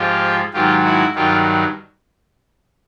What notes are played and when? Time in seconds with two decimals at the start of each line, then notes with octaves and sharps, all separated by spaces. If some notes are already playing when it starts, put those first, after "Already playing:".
Already playing: G#2 F3 F4 G4
0.53 G#2 D#3 F#3 F4 G4
0.84 E4 F#4
1.15 G2 D#3 F#3 F4 G4